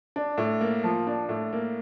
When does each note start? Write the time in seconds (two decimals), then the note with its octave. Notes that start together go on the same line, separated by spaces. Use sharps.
0.16 D4
0.38 A2
0.61 A#3
0.84 F3
1.07 D4
1.29 A2
1.53 A#3